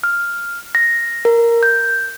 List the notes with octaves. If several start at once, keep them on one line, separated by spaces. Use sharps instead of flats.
F6
A#6
A#4
G6